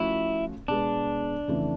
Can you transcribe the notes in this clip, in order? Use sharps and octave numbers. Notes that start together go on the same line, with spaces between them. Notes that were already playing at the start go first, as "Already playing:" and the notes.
Already playing: F3 A3 C#4 E4 F#4
B2 G#3 B3 D4
F2 C#3 E3 A3